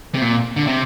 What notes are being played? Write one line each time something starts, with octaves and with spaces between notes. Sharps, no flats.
C3
A#2
D3
C3